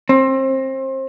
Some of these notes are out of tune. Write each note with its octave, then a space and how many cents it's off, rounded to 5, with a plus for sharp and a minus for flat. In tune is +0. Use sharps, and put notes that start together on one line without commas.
C4 +30